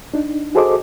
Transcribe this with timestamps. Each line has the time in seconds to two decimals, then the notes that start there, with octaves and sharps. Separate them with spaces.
0.14 D4 D#4
0.55 F#4 G#4 A4 C5 D#5 D6